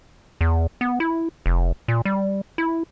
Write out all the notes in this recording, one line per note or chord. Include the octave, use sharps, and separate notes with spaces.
E2
B3
E4
F1
A#2
G3
E4